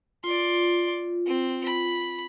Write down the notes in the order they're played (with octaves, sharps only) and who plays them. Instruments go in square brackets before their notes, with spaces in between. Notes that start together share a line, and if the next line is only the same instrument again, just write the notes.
[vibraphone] F4 [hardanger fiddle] D5 C6
[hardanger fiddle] C4
B5